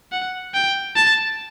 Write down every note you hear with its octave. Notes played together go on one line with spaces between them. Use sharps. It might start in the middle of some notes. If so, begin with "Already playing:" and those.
F#5
G5
A5